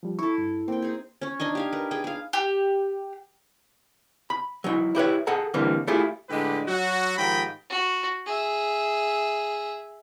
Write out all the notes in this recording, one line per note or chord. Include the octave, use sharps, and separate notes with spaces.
F3 G3
E4 A4 C#6
G2
A#3 C4 G5
D#4 G#4
C#4 C#5
D4 D#4 D#5 G#5
G4 F5 G#5
A#4 B4
G#4 B4 G5
G#4 F5
G4
B5
F#3 D#4 E4
E4 G4 B4 C#5
G#4 A4 F#5 A#5
D3 E3 G3 A#3 C4
A3 E4 F4 G4 G#4
A2 D3 G#3 D4 G4 B4
F#3 F#4
G#2 D#3 F3 G4 G5 B5
F#4
G#4 E5